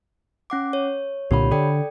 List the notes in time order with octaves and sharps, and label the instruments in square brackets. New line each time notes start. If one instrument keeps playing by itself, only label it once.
[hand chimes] C#4 F#5 D6
C#5
[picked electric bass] C2 A#2 D3 [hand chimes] G4 C#5 B5
[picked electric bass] D3 [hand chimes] A4 D5 G5